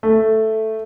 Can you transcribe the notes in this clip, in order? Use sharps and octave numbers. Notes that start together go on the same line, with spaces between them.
A3